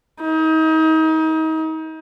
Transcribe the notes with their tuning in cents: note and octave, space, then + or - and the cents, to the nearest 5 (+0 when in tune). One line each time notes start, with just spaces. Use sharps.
D#4 +35